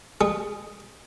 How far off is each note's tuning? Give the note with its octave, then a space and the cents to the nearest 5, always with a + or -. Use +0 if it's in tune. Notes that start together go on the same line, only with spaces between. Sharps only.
G#3 -35 G#4 +0